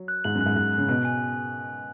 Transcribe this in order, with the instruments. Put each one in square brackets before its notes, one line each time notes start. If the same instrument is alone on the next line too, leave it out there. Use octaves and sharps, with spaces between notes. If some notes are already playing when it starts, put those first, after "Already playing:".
Already playing: [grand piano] F#3
[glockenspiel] F#6
[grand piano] G#2 [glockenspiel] F#7
[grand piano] F#2
[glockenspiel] F#6
[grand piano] G#2
[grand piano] G#2 [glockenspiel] F#6
[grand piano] C#3 [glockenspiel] F#6
[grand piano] B2 [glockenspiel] F#6
[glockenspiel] G#5